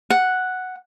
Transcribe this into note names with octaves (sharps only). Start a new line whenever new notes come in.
F#5